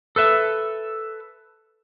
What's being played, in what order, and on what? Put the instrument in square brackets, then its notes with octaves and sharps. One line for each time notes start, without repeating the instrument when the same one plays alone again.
[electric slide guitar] A4 B4 E5